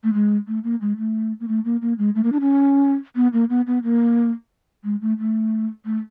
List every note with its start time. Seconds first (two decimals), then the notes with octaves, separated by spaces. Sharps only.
0.04 A3
0.14 G#3
0.47 A3
0.64 A#3
0.81 G#3
0.98 A3
1.40 A#3
1.48 A3
1.65 A#3
1.82 A#3
1.98 G#3
2.15 A3
2.24 A#3
2.32 D4
2.41 C#4
3.16 B3
3.33 A#3
3.50 B3
3.67 B3
3.83 A#3
4.84 G#3
5.02 A3
5.19 A3
5.85 A3